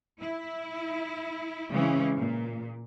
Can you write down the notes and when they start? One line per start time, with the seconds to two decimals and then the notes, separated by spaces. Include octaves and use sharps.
0.21 E4
1.72 C#3 E3 G#3 C4 C#4
2.17 A#2